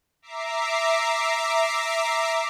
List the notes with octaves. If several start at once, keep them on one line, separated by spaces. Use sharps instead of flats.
E5 A#5 D6 C7